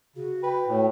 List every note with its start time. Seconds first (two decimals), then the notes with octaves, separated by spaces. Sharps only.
0.16 C#3 F#4
0.43 B4 G5
0.67 A2